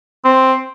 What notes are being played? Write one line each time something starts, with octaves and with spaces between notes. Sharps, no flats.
C4